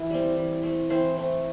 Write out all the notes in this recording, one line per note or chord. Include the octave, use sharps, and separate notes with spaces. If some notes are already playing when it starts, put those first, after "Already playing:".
Already playing: E3 E4
G3 C4
E3
A3 C4
E3 C4 C5
A3 C4